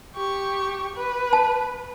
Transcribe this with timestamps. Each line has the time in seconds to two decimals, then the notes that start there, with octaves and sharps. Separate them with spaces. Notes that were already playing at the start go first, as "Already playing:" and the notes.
0.16 G4 C#6
0.96 B4
1.33 A5